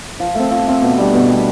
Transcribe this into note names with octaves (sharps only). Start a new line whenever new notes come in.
F3
A3 C4
F3
A3 C4
B2
G3 D4 G4
B2
G3 D4 G4